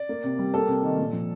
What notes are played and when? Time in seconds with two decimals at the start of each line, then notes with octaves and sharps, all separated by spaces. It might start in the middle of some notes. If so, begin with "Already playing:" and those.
Already playing: D5
0.09 A#3
0.24 C3
0.39 G3
0.54 A#3 A4
0.69 C3
0.83 D#3
0.98 A#2
1.13 F3